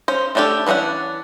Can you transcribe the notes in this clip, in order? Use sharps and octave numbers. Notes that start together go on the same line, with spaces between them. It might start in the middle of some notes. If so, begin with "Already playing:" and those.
C#4 C5
A3 C#4 D4 G4 A4
E3 B3 C#4 D4 F#5